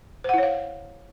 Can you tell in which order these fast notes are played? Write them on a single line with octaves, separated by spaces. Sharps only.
C5 F#5 E4 C#5 F5